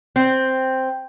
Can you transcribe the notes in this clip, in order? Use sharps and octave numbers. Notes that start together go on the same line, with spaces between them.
C4